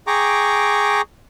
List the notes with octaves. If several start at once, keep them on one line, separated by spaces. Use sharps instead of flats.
G#4 G5 A#5 C#6 D6